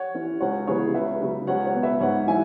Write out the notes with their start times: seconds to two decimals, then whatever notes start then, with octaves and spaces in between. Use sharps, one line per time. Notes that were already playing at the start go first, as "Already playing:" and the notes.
Already playing: C#5 F#5
0.15 E3 C#4
0.41 C#2 C#5 F#5
0.67 C#3 E3 B3 G#4 C#5
0.94 C#2 B4 E5
1.21 C#3 F#3 B3
1.47 C#2 C#5 F#5
1.65 C#5 F#5
1.74 B2 B3
1.83 B4 E5
2.01 G#2 C#5 F#5
2.27 E3 C#4 E5 G#5